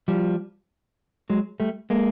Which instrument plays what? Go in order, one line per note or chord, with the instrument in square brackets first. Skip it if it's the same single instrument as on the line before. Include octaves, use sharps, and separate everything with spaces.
[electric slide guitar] F3 G3
F#3 G#3
G3 A3
G#3 A#3